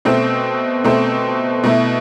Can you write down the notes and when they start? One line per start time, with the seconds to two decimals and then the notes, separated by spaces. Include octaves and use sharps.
0.05 B2 A3 C4
0.84 B2 A3 C4
1.64 B2 A3 E4